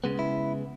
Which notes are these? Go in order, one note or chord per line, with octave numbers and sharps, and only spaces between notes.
C#3 G#3 B3
E4